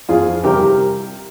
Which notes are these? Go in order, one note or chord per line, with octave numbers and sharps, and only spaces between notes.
F2 F4 G#4
C3 G3 G4 A#4